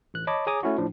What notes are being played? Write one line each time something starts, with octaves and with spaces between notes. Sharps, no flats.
A1 F#6
C#5 D#5 A5 B5 D6
G#4 C#5 G#5 A#5 D6 D#6
A3 C#4 E4 F#4
A2 F3 D4